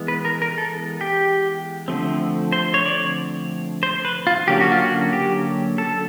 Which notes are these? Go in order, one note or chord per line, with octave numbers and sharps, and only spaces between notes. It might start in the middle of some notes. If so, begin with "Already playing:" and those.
Already playing: E3 G#3 B3
B4
A#4
A#4
A4
G4
D3 F3 A3 C4
C5
C#5
D5
C5
B4
F4
D3 F#3 A#3 C#4 G4
F#4
F4
F#4
G4
A4